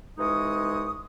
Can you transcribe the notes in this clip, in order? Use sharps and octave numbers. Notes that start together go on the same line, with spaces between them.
C2 E3 G#3 D#4 C#6 D#6